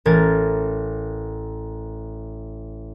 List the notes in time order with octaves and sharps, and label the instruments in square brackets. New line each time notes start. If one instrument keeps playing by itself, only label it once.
[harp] A1 A#4 G#6 A6